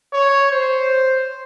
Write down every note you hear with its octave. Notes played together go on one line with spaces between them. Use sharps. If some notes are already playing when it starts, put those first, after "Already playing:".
C#5
C5